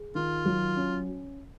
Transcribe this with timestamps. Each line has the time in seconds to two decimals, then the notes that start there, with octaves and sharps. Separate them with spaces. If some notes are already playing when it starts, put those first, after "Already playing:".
Already playing: G#4
0.15 D#3 F4
0.45 F#3
0.76 C#4